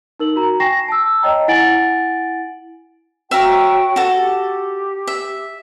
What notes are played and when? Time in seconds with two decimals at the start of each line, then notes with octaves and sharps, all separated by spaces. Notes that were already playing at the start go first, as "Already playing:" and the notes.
0.19 D#4 A#4 F#7
0.36 F#4 A#5
0.60 G5 G#5 C#6 A#6 C7 E7
0.88 A5 E6
1.22 C#5 D#5 G5 A#5
1.48 E4 F#5 G#5 A6 D7 F#7
3.31 F#4 C#5 E5 F5 G5 A#5
3.96 F#4 A4
4.15 G4
5.07 E5